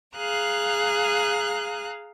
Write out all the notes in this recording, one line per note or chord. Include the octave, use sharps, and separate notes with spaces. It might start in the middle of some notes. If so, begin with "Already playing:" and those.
G#4 F5 A#5 F#6